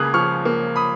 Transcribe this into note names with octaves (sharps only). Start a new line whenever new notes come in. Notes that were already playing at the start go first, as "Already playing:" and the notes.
Already playing: C#2 C#3 A#3 D#6 F#6 G#6
F3 C#6 F6
A#3
B5 D#6